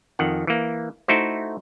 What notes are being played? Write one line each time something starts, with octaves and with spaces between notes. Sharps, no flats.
F2 D#3 F#5
E3 A#3
A3 D#4 E4 F#4 C5